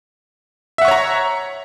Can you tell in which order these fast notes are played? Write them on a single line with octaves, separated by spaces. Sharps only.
E5 F#5 C#6 C#5 A#5